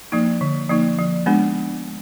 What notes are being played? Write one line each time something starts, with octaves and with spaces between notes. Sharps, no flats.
F3 A#3 D#4
D3
F3 A#3 D#4
F3
G#3 B3 D4